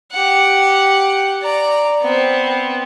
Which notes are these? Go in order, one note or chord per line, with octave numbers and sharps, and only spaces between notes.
G4 F#5
D5 A#5
B3 C4